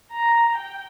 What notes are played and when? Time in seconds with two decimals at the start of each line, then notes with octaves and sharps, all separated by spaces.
0.12 A#5
0.54 G5